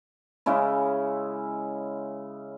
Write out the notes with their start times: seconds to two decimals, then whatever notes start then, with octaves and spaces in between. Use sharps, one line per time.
0.46 C#3 G#3 C#4 E4